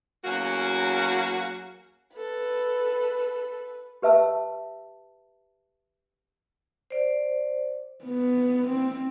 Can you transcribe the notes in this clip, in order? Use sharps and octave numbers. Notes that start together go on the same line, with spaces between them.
E2 F#3 A#3 C#4 F#4 F5
A4 B4
G4 B4 E5 A5 E6
C5 D5
B3
C4